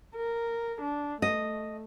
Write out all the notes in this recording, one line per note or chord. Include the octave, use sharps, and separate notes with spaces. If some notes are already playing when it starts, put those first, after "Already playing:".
A#4
D4
A3 D#5